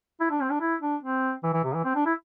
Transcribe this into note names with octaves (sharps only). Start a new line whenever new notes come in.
E4
D4
C4
D4
E4
D4
C4
E3
E3
C3
E3
C4
D4
E4